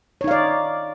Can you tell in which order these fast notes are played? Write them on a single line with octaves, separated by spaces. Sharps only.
C#5 D#4 F5 D5